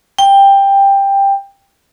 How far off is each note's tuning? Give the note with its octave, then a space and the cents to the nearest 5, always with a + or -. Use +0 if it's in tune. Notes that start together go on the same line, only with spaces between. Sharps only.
G5 +15